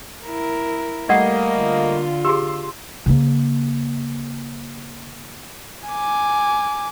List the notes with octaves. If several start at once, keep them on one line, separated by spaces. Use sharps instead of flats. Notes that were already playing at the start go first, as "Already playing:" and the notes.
E4 A#4
G3 A3 A#3 D5 D#5 F#5
D3 F4
G4 G#4 C6 E6
C#3 A#3
G#5 D6